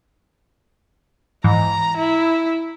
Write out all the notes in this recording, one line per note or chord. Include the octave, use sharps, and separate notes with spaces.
G#2 E3 A#5
E4